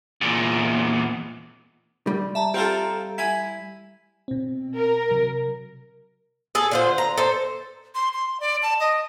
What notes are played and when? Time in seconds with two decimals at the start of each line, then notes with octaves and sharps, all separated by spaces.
0.21 E2 A#2
2.07 G3
2.35 E5 A5 A#5
2.54 C4 F4 G4 A4 A#5
3.18 E4 G#5 B5 B6
4.28 B2 C4
4.76 A#4
5.11 C3 F#3
6.55 G#4 A4
6.71 D3 F4 C5
6.98 A#5
7.17 A4 C5
7.95 C6
8.14 C6
8.40 D5
8.63 A5
8.80 D#5